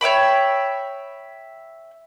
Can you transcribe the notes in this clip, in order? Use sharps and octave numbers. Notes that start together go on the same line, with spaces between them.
C#5 E5 G5 B5